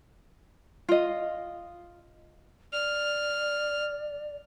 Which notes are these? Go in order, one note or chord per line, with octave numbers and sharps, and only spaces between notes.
F4 D#5
D5 F6